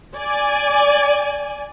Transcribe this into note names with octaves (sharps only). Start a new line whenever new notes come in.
D5 G#5